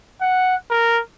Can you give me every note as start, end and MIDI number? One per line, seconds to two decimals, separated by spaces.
0.21 0.56 78
0.71 1.00 70